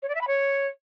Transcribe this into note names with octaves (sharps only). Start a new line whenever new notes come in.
C#5
D5
E5
B5
C#5